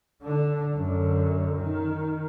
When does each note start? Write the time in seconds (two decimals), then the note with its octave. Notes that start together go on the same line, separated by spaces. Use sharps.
0.23 D3 D4
0.75 F#2 D3
1.58 D#3